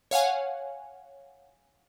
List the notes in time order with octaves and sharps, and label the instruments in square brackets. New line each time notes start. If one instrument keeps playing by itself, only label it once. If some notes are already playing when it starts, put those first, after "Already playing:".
[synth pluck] C#5 F5 F#5 G#5